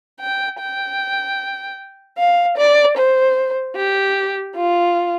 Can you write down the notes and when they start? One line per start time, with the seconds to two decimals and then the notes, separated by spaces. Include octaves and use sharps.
0.21 G5
0.60 G5
2.18 F5
2.58 D5
2.97 C5
3.77 G4
4.55 F4